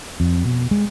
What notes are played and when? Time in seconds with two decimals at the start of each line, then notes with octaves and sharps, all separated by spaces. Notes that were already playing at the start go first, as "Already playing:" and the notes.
0.20 F2
0.45 B2
0.71 G#3